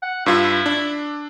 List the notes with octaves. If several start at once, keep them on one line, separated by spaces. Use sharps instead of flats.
F#5
G2 E4 F4 E6
D4